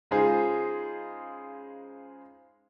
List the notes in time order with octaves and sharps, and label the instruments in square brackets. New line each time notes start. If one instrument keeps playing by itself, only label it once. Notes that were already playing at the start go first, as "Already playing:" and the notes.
[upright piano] C#3 G#3 D#4 F4 G#4 C5